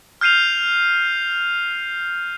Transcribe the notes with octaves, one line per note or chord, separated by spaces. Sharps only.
F6 G6 C7 D#7 F7